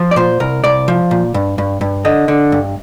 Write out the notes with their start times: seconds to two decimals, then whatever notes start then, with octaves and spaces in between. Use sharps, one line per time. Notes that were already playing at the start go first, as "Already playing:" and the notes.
Already playing: F3
0.11 D5
0.16 A#2 C5
0.40 C2 A#4
0.64 C2 D5
0.88 F3
1.11 A#2
1.34 G2
1.58 G2
1.81 G2
2.05 D3 D#5
2.28 D3
2.52 G2